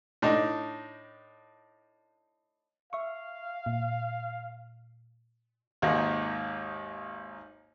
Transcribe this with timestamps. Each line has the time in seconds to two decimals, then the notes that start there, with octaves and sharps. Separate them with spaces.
0.22 A2 D4 D#4
2.93 E5 F5 C#6
3.66 A#2
5.82 G#1 D#2 G#2 A#3 F#5